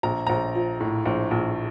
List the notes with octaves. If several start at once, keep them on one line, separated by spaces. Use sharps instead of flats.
A#1 A#5
A#1 A#5
F3
A2
A#1
A#1